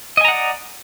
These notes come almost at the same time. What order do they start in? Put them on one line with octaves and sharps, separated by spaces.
D#5 G#5 A#5 F#5 D5